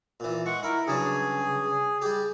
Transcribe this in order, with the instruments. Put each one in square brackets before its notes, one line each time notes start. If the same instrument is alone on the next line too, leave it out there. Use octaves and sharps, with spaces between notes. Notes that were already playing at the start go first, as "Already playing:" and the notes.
[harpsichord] A#2 E3
[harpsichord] G#3 [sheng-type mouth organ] F#5 C#6
[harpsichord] E4 [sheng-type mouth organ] A#4
[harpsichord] G2 F#3 D4 [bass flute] C#3 [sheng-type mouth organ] G#4
[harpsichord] G3 G4 [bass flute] G#4